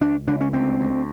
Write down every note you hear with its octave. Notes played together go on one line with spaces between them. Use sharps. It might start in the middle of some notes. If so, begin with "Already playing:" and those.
C#2 D4
C#2 D4
C#4
D2 C4
D2